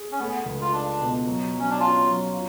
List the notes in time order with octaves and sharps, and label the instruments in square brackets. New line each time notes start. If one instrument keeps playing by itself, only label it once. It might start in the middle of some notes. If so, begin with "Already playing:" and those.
Already playing: [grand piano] G#4
[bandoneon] C#4
[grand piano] A3 [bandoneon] B3
[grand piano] C#2
[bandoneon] F4
[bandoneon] D4 [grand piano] F4
[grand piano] B2
F#3
F#3
[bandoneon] C#4
D4
[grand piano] C#4 [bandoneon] F4
[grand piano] F#3
F4